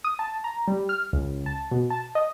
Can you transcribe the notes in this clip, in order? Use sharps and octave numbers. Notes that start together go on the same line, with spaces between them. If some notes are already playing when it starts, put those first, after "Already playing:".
D#6
A5
A#5
G3
F6
C#2
A5
B2
A5
D#5